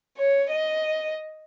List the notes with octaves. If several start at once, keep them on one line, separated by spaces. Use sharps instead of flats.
C#5
D#5